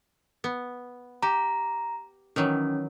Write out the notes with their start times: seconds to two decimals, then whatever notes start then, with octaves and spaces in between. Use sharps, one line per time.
0.44 B3
1.23 G4 A#5
2.36 D#3 E3 F#3 C#4